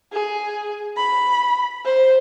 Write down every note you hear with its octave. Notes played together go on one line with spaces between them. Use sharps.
G#4
B5
C5